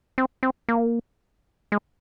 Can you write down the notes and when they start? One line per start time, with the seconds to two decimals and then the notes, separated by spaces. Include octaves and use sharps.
0.18 C4
0.43 C4
0.69 A#3
1.72 G#3